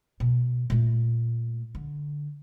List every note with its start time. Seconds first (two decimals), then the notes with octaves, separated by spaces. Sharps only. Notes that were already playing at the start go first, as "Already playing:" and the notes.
0.20 B2
0.70 A#2 A3
1.75 D3